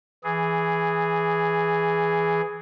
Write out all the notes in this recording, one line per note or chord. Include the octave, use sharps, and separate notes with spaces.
E3 G#4